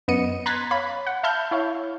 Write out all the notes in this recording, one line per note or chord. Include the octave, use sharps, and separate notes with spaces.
F#2 B3 D#5 C#7 D#7
A#5 C6 F#6 G#6 A6 B6
C#5 F5 B5
F#5
E5 F5 A5 B5 F6 G6
E4 C#5 F5